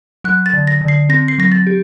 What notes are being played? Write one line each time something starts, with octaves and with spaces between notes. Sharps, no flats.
F#3 F#6
A6
D3
A#6
D3
C7
C4 A#6
C7
F#3 A#6
A6
G4